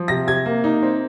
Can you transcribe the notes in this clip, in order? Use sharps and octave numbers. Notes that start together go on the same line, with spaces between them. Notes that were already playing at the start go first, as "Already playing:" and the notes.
Already playing: F3
C3 A#6
C3 G#6
A#3
D#4
C4